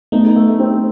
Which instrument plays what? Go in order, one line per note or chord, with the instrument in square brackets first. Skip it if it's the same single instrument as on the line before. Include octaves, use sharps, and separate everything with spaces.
[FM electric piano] A3 B3 [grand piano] D#4
[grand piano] A3
C4